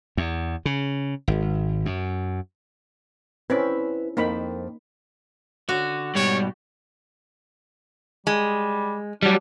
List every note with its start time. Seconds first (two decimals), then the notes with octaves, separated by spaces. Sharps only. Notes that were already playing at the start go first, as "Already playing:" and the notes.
0.17 E2
0.65 C#3
1.28 G#1
1.86 F#2
3.50 C4 C#4 E4 B4
4.17 F2 A#3 C4 D#4 B5
5.69 D3 F#4
6.15 G#2 B2 G3 C#5
8.27 G3 G#3
9.22 F#3 G3 D4